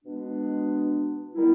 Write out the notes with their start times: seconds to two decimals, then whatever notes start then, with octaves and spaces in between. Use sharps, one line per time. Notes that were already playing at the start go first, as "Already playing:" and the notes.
0.05 B2 G#3 B3 D4
1.34 D#3 G3 B3 E4